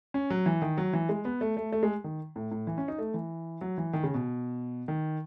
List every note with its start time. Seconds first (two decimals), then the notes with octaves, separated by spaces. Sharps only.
0.14 C#4
0.30 F#3
0.46 E3
0.62 D#3
0.78 F#3
0.93 E3
1.09 G#3
1.25 B3
1.41 A3
1.57 A3
1.72 A3
1.83 G#3
2.04 D#3
2.36 A2
2.51 A2
2.67 E3
2.78 C#4
2.88 D#4
2.99 A3
3.14 E3
3.61 F#3
3.78 E3
3.93 D#3
4.03 C#3
4.14 B2
4.88 D#3